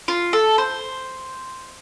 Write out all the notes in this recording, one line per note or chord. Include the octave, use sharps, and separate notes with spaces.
F4
A4
C5